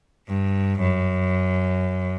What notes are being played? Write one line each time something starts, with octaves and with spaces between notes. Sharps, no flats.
G2
F#2